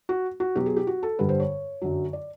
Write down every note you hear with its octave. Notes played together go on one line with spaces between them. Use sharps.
F#4
F#4
B2 F#3 G4
G#4
G4
F#4
A4
G2 D3 G3 B4
C5
C#5
F#2 D3 F#3
D5